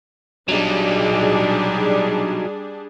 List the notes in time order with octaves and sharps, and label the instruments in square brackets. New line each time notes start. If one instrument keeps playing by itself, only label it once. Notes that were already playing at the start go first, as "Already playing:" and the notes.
[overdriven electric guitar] F#3 D#4 [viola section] G3 D4 G#4